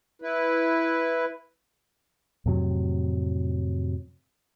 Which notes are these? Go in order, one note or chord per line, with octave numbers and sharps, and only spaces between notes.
E4 B4
F2 A2 C3 F#3